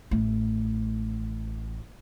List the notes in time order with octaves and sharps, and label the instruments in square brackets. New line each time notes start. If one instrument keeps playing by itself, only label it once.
[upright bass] A1 A3